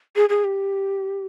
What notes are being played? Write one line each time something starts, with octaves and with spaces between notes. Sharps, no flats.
G#4
G#4
G4